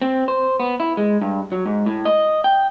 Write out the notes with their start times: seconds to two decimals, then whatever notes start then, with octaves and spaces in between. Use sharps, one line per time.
0.02 C4
0.28 C5
0.60 B3
0.80 E4
0.97 G#3
1.21 G2
1.52 F#3
1.66 G#2
1.86 A2
2.05 D#5
2.44 G5